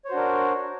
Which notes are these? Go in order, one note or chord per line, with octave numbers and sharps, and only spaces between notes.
D4 F#4 A#4 C5 C#5